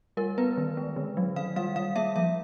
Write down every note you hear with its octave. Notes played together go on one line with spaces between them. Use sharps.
G3 A#4
B3 B4
D#3
G#3
D3
F#3
D#3 F5
G3 F5
G3 F5
A#3 E5
F3 E5